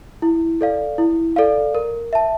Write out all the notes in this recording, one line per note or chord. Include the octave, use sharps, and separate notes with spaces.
E4
A4 D5 F5
E4
A4 D5 F5
A#4
E5 A5